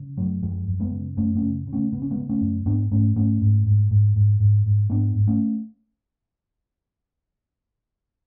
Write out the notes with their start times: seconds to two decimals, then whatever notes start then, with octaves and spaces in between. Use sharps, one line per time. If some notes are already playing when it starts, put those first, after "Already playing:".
Already playing: C#3
0.17 F#2 F#3 A3
0.42 F#2 F3 G#3
0.67 F#2
0.80 G#3 B3
0.92 C#3
1.17 F#2 A3 C#4
1.35 A3 C#4
1.42 C#3
1.67 C#3
1.73 A3 C#4
1.92 C#3 B3
2.02 C#4
2.11 G#3 B3
2.17 C#3
2.29 A3 C#4
2.41 F#2
2.66 G#2 B3 D4
2.91 G#2 A3 C#4
3.16 G#2 A3 C#4
3.41 G#2
3.66 G#2
3.91 G#2
4.16 G#2
4.40 G#2
4.66 G#2
4.90 G#2 B3 D4
5.15 G#2
5.27 A3 C#4